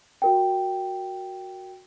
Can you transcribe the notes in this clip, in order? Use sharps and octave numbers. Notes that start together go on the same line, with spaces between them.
F#4 A#4 G5